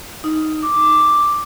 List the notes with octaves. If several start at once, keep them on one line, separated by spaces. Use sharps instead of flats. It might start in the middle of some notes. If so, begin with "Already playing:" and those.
D#4
D6